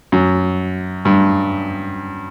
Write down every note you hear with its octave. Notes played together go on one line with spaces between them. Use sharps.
F#2
G2